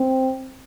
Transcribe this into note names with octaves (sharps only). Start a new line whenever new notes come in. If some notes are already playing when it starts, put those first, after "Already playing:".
Already playing: C4